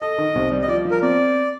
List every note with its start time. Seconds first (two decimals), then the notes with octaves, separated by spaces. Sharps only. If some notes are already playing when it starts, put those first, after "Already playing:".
0.01 A4 D#5
0.18 D#3
0.35 C2
0.51 G3
0.62 D#5
0.68 F3 D5
0.85 F3
0.91 A#4
1.02 C4 D5